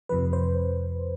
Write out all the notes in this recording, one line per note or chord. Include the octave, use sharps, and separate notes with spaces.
F2 C3 F3 B4
C5